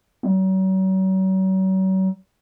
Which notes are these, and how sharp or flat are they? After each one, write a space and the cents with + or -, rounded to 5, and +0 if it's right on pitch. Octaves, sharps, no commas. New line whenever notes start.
F#3 +40